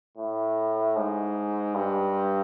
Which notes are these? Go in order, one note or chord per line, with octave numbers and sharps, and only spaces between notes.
A2
G#2
G2